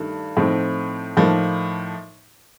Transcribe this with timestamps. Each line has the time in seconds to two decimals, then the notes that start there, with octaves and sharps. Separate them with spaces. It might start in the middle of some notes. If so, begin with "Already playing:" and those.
Already playing: G2 D#3 A3
0.37 A2 F3 C4 D#4
1.17 A2 F3 A#3 D#4